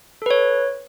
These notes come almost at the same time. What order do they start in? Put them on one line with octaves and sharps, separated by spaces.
A4 B4 C#5